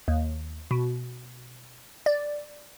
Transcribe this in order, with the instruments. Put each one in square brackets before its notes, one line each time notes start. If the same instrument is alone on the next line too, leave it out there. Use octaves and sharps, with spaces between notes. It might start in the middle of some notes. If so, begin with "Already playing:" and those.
[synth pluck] D#2
B2
D5